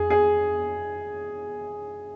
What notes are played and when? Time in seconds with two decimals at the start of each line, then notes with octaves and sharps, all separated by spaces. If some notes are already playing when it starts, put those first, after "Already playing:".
Already playing: F2 G#4
0.10 G#4